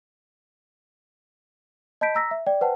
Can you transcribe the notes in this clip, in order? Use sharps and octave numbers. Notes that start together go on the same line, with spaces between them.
D#5 A5 B5 G6 B6 D7
A#5 E6 A#6 B6
E5
D5 G5
B4 C5 F#5 G5 A5